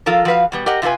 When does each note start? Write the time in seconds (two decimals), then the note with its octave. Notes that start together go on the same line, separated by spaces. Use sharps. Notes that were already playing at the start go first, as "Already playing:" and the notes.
0.06 F3 F4 A4 A#4
0.25 F3 F#4 B4 F5
0.52 B2 G3 B3
0.66 G4 A#4 D#5 F#5
0.82 C3 E4 F4 B4 G#5